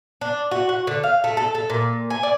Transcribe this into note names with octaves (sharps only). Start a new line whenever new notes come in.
D4
F#4
F#4
D3
F5
A3
A4
A4
A#2
G#5
D5